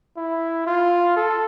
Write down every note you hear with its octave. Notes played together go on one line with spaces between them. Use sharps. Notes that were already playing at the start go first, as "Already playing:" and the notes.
E4
F4
A4